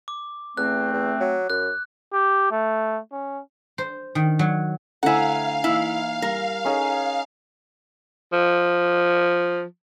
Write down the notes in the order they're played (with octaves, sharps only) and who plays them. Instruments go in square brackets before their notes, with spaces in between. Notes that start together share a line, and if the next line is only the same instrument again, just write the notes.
[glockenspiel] D6
[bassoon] E2 [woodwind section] A3 C4 [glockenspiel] F#6
[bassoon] E2
F#3
[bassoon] F#2 [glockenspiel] F#6
[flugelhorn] G4
A3
C#4
[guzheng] C5
D#3
F#3
[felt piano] D3 A3 C5 [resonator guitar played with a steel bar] E4 F#5 [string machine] F5 [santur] G#5 A#5
[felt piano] E3 A#3 D#4 [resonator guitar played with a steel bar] E4
[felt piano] G3 [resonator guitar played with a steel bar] A#4
[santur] C#4 D#4 G#4 [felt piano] A4
[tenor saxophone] F3